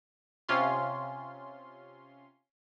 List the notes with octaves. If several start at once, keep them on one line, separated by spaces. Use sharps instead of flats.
C3 C#4 F4 C6